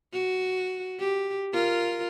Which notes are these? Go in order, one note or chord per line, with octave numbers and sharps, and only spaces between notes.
F#4
G4
F4 A#4